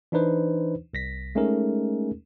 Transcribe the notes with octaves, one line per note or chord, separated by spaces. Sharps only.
E3 D4 D#4 B4 C5
C2 A#6 B6
G#3 A3 C#4 D#4 G#4 A#4